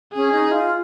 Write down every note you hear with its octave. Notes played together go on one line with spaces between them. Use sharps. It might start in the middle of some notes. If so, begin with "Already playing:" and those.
C#4 G#4
D#4
F4